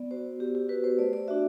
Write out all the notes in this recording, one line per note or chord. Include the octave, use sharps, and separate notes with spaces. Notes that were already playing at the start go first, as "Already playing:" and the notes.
Already playing: B3 D5
F#4 C5
B3 G4
G4
F#4 B4
C5
A3 D5
D5
D4 F#4 E5